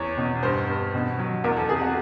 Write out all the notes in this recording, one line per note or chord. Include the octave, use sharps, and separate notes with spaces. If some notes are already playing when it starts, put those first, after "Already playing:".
Already playing: E2 C#5
B2
G2 C5
G2
B2
F#3
E2 A#4
A4
C3 G#4
F#4